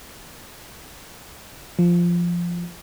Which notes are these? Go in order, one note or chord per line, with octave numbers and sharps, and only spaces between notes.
F3